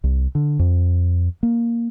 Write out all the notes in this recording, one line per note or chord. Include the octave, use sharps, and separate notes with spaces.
C2
D3
F2
A#3